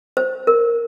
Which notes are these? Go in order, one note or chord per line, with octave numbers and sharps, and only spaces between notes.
C5
A#4